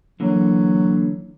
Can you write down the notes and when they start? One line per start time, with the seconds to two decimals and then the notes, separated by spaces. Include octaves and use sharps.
0.20 D3 E3 F#3 A#3